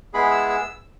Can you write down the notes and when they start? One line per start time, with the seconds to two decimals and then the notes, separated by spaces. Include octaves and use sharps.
0.13 G#3 B3 E4 G#4 B5
0.31 E6
0.50 E6